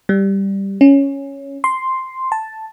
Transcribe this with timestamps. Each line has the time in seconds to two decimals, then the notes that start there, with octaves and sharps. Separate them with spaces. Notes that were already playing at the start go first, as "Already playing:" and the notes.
0.09 G3
0.81 C#4
1.64 C6
2.32 A5